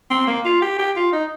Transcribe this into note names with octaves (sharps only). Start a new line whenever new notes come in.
C4
A#3
F4
G4
G4
F4
D#4